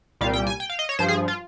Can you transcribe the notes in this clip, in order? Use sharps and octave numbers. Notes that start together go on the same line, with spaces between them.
C2 A#2 G3 F5
G5
G#5
G5
F5
D#5
C#5
G2 F3 C5
G#4
F4